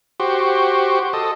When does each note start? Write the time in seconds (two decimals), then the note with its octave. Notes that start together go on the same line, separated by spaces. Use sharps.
0.20 F#4 G4 C5
1.13 A4 D#5